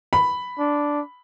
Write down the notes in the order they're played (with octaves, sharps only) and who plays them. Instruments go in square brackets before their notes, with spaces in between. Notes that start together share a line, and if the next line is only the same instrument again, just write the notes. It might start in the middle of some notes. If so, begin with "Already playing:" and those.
[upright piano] B5
[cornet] D4